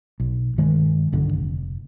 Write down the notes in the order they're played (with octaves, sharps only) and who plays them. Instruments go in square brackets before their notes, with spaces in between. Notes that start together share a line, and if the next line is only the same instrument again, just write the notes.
[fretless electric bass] B1
G2 D#3 E3 G#3
B1 G2 D3 D#3
F1